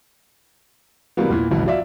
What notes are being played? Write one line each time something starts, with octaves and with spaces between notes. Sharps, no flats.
C3 E3 F#3 G3 A#3 B3
E2 A#2 E3
G#1 C#2 G#2 B2 E3 F#3
F#3 F4 D5 E5